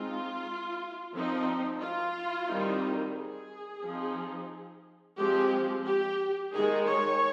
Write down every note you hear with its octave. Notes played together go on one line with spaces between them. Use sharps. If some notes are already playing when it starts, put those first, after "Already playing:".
Already playing: G#3 C4 D#4 F4
F3 C4 D#4
F4
D#3 G3 C4 D#4
G#4
F3 C4 D#4
F3 G#3 C4 G4
G4
D#3 G#3 D#4 G#4
C#5